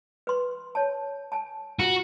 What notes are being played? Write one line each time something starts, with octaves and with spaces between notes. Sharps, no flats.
B4 C6
C#5 A5
G#5 A5
F4 F#4